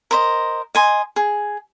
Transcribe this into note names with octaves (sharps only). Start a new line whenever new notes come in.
A#4 C5 D#5
D#5 G#5 C6
G#4